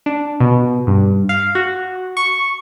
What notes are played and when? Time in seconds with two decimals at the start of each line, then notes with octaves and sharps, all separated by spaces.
0.06 D4
0.40 B2
0.87 G2
1.29 F5
1.55 F#4
2.17 C#6